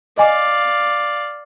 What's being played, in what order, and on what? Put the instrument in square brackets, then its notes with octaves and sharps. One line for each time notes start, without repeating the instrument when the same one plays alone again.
[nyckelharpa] D5 F5 [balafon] D#5 G#5 D6